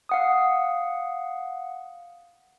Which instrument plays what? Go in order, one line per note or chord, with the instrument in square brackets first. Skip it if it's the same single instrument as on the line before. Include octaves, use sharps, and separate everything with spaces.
[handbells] F5 F#5 D#6